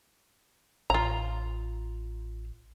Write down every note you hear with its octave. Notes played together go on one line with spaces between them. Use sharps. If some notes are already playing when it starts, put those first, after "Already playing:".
A1 F4 A#5